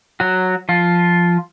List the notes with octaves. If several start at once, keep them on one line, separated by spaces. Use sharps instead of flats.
F#3 F#4
F3 F4